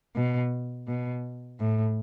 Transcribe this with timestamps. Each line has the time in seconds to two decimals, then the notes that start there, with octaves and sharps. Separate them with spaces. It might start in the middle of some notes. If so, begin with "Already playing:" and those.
0.16 B2
0.88 B2
1.60 A2